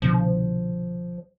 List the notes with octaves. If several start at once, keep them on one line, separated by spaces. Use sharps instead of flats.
C2 B2 D3 F3